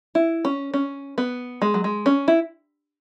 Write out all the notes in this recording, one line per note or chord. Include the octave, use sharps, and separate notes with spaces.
E4
C#4
C#4
B3
G#3
F#3
G#3
C#4
E4